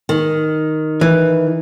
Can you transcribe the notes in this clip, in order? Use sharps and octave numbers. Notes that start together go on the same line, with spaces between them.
D#3
E3